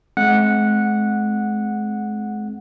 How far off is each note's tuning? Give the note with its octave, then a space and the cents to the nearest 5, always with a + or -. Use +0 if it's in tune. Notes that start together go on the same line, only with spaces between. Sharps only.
G#3 +40 C4 +0 F#5 -10